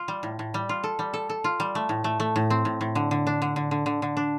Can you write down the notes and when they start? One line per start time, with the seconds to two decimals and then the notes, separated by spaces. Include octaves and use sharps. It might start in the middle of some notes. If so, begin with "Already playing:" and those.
Already playing: F4
0.08 G3
0.23 A2
0.39 A2
0.54 G3
0.69 F4
0.84 A4
0.99 G3
1.14 A4
1.29 A4
1.44 F4
1.60 G3
1.75 A3
1.89 A2
2.04 A3
2.20 A3
2.36 A2
2.50 C4
2.65 A2
2.81 A2
2.95 D3
3.11 D3
3.27 D4
3.42 D3
3.56 D3
3.71 D3
3.86 D3
4.02 D3
4.17 D4